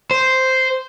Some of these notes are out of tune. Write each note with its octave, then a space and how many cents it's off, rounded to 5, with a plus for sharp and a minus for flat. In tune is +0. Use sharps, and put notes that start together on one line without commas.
C5 -5